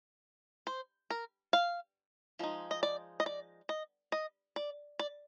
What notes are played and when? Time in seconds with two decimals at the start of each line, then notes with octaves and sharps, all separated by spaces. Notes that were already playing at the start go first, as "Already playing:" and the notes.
0.67 C5
1.10 A#4
1.53 F5
2.39 F3 G#3 D#4
2.71 D#5
2.83 D5
3.20 D#5
3.26 D5
3.69 D#5
4.12 D#5
4.56 D5
4.99 D5